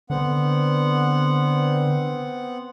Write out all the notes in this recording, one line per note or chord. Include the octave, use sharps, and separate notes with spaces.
D3 B3 C4 F#5